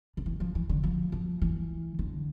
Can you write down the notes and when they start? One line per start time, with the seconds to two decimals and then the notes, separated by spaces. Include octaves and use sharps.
0.17 D3
0.26 E3
0.40 F3
0.55 E3
0.69 D3
0.83 F3
1.12 F3
1.42 E3
1.99 D3